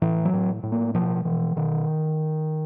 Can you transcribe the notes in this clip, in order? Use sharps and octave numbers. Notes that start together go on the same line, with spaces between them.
A2 E3
F#3
A2
A2
A#3
B2 F3
B2 E3
B2 D#3